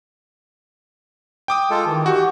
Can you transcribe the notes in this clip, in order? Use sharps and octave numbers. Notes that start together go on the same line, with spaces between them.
G5 D6 D#6
G#3 F4 A4
D#3 E3
F#4 G4 C#6